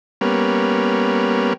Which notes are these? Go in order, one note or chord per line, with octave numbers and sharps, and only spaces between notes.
G3 A#3 B3 C#4